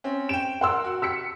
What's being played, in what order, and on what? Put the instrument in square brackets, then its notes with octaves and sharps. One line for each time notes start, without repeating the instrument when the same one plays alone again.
[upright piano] C4 C#4
[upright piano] G5 D7 [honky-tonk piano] E7
[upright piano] A#4 [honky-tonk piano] F#5 C6 E6
[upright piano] F#4
[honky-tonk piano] E6 B6 C#7